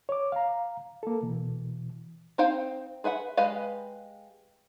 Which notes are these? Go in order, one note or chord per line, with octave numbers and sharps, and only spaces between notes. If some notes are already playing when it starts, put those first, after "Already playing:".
C#5 D6
F5 A#5
A#3 A4
B2 E3
C4 D#4 C5 F5 G5
G#4 B4 E5 F#5
G#3 G4 B4 D#5 F5